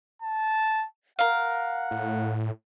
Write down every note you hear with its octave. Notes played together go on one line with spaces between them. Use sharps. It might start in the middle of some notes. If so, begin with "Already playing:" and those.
A5
A#4 F5 F#5
A2